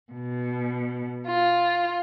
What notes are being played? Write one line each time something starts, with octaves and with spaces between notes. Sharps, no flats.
B2
F4